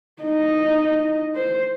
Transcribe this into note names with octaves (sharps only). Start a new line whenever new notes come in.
D#4 D#5
C5